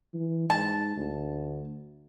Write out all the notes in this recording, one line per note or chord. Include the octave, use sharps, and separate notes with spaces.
E3
G#2 A5
D2